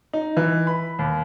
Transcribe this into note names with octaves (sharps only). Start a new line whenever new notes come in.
D#4
E3
B5
D#2